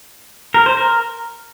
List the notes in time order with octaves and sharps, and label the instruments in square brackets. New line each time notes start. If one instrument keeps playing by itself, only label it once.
[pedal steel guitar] A#4
C5
A#4